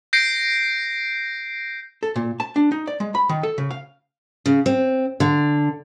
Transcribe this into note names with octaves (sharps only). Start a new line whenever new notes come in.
G6 A#6 C7 D7
A4
A#2
A5
D4
D#4
D5
G#3
B5
D#3
A4
C#3
F5
C#3
C4
D3